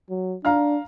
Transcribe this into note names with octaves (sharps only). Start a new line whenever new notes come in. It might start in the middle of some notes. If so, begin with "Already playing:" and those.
F#3
D4 F5 A#5 F6